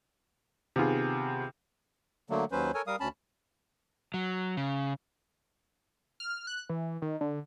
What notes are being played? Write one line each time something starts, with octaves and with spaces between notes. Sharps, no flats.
C3 D#3 B3 F4 G#4
D3 F#3 A3 A#3
D#2 F#3 C#4 B4 C5
A4 A#4 C#5 G#5
G3 A#4 F5 D#6
D2 C#4 A5 B5
F#3
C#3
F6
F#6
E3
D#3
D3